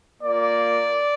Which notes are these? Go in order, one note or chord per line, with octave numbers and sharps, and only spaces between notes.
A#3 F4 D5